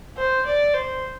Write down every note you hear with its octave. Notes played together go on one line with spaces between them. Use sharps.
C5
D5
C5